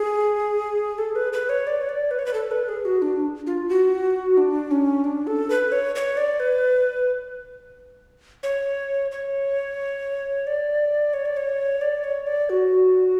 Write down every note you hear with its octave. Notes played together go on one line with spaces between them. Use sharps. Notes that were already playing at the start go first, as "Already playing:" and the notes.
Already playing: G#4
A4
B4
B4
C#5
D5
C#5
D5
B4
C#5
B4
A4
B4
G#4
F#4
D4
F4
F#4
D4
C#4
D4
A4
B4
C#5
C#5
D5
B4
C#5
C#5
D5
C#5
D5
C#5
D5
C#5
D5
F#4